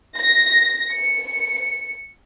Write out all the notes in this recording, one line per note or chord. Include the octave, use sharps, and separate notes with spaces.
A#6
C#7